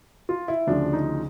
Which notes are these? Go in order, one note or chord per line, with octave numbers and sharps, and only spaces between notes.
F4
E4
D2 C#3 F3 D4
D#4